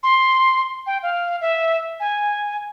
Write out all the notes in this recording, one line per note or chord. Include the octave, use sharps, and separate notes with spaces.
C6
G5
F5
E5
G#5